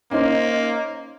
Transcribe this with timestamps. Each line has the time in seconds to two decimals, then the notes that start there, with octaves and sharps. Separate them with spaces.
0.11 A#3 C#4 D#4 C5